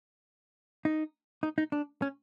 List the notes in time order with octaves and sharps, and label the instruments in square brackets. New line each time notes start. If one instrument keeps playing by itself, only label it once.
[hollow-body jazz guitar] D#4
D#4
D#4
D4
C#4